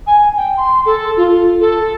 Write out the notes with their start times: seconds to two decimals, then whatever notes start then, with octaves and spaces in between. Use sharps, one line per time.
0.07 G#5
0.37 G5
0.57 C6
0.86 A4
1.17 F4
1.61 A4